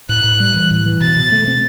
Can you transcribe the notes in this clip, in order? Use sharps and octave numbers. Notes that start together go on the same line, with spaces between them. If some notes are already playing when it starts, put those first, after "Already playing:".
A2 F#6
A2
G3
E3
A2
E3
B2 A6
B2
A3
C4